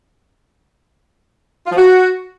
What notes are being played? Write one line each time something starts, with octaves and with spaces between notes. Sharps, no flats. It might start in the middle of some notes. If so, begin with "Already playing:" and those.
F4
F3
F#4